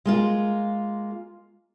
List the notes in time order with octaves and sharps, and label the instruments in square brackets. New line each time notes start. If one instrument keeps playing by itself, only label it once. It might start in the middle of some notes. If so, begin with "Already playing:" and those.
[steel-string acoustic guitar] G#3 A#3 F4